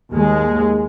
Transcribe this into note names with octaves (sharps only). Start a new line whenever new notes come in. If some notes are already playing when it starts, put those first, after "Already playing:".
D#2 G#3